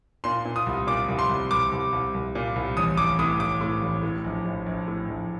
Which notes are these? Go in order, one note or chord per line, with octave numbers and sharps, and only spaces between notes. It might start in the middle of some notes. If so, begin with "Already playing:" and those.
A#2 C6
A#2
D#6
C2
A#2 D6
C2
C6
C2
C2 D6
C2
C2
C2
A#2
C2
A1 D#6
A1 D6
A2 D#6
A1 D6
A2
A1
A2
A#1
A#1
A#1
A2
A#1